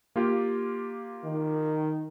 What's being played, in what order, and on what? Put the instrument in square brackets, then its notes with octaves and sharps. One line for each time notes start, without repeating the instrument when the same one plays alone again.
[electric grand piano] A#3 F4 G4
[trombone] D#3